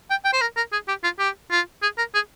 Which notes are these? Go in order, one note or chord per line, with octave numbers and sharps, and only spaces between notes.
G5
G5
C5
A#4
A#4
G#4
G4
F4
G4
F4
G#4
A#4
G#4